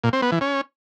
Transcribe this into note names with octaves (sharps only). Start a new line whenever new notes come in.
A#2
C4
B3
E3
C#4